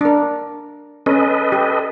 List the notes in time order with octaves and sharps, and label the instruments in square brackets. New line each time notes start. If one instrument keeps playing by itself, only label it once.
[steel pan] D4 A#4
[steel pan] C#4 [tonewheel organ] A4 B4 D#5
[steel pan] G4